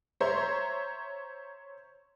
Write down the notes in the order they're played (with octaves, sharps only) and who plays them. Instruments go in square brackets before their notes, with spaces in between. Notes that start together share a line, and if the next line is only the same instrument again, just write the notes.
[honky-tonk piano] C5 C#5 E5 A#5 C6